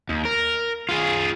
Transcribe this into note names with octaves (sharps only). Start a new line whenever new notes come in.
D#2
A#4
F4 G#4